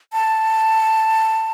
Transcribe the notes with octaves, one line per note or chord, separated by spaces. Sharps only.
A5